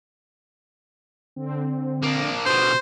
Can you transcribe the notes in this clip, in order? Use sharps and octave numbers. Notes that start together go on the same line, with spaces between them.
D3 C4
A#3 D4
B2 D3 C5